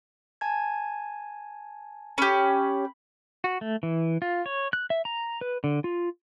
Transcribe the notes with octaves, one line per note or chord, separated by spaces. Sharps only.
G#5 A5 G#6
C#4 G4 B5
F#4
A3
E3
F4
C#5
F#6
E5
A#5
B4
D3
F4